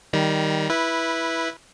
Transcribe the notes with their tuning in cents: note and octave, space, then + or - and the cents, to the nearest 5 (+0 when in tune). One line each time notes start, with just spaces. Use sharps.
D#3 +0 G3 +0 A#5 +35
E4 +0 B4 -10